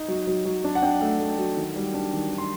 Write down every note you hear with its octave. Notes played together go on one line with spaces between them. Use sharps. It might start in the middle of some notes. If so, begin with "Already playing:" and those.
Already playing: D#4
F#3
F#3
F#3
D4
F#5
D4 G5
A3
A3
F#3
D#3
G3
D4
D#3
D#3
C6